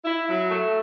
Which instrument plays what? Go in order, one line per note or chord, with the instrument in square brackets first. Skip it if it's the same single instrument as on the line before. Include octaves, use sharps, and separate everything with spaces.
[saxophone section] E4
F#3
A3